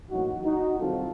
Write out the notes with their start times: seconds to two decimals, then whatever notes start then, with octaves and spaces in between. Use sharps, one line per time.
0.10 A1 A2 F#3 A#3 D#4 F#4
0.45 D#4 F#4
0.79 C2 C3 D#3 F#3 C4 F4 A4